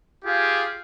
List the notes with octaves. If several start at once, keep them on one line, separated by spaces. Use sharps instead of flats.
F4 G4 G#4 F5